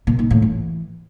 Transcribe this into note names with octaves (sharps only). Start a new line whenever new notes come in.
A#2
D#3
A2
E3